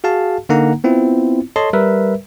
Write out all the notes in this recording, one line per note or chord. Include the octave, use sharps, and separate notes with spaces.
F#4 G#4 F5 A5
D3 A#3 D#4 F#5 A#5
B3 C4 E4 F4
A4 C#5 D#5 A5 C6
G3 A#4 B4 E5